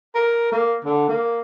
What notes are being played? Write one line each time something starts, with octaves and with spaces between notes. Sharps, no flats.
A#4
A#3
D3
A#3